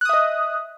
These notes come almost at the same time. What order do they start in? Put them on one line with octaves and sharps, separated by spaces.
F#6 D#6 E5 D#5